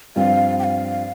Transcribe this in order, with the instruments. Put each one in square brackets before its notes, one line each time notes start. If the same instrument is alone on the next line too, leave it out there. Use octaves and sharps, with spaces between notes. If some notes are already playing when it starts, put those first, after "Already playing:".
[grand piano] G2 F3 C4 [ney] F5
[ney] G5
F5